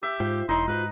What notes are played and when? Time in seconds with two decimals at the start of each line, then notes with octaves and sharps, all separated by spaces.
0.03 G4 E5
0.20 G#2 F4 C5 G5
0.49 E1 D#4 E4 C#5 C6
0.68 G#2 F4 F#4 B4 C5